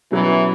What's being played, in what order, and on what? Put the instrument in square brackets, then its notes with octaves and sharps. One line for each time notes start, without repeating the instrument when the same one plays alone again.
[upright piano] B2 F#3 C#4 E4 [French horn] E3